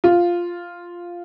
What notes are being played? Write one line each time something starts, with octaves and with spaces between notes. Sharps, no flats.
F4